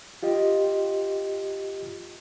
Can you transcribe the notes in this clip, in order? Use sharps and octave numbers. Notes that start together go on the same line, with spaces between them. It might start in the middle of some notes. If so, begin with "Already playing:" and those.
F4 G4 D#5